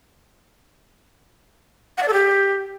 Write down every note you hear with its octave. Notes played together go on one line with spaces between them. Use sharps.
F#5
D5
A4
G4